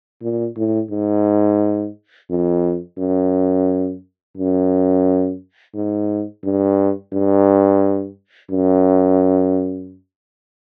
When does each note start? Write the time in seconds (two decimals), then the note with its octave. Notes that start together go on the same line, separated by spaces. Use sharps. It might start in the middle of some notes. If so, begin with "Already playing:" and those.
0.22 A#2
0.57 A2
0.91 G#2
2.30 F2
2.98 F#2
4.37 F#2
5.75 G#2
6.44 G2
7.13 G2
8.51 F#2